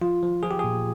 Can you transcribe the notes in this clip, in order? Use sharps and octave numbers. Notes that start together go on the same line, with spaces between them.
F3 F4
F3
F3 G#4
G4
A#2 G#4